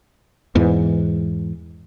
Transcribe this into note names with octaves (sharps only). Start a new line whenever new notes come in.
E2 G#2 E3